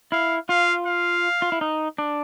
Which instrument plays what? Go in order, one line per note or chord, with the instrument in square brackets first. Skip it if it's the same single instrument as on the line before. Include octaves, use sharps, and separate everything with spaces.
[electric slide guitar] E4 [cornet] F5
[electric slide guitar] F4 [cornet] F5
[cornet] F5
[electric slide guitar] F4
E4
D#4
D4